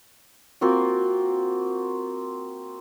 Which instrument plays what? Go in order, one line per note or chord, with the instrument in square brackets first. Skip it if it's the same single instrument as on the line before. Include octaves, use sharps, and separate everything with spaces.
[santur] A#3 C4 F4 F#4